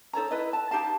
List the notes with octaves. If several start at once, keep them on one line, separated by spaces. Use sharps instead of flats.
D#4 A4 C#5 A#5
E4 B4 D#5
A5
D#4 G4 F5 A5